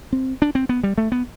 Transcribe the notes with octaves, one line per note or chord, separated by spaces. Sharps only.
C4
D4
C4
B3
G3
A3
B3